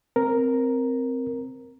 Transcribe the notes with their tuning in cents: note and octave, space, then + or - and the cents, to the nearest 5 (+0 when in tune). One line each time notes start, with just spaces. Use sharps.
C4 +0 A#4 +0